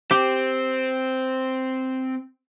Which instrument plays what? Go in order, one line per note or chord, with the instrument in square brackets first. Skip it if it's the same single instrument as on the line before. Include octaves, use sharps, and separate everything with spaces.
[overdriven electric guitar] C4 [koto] G4